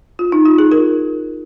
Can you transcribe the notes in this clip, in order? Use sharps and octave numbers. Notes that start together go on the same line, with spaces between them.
F4
D#4
F4
D#4 G#4
F4 A#4